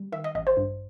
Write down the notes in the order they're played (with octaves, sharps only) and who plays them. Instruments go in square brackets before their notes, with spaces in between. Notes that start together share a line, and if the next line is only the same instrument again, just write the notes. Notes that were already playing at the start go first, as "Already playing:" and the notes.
Already playing: [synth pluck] G3
D#3 E5
D#5
A1 D#5
C5
G2